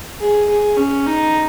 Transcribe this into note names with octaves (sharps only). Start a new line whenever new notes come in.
G#4
G#4
C#4
D#4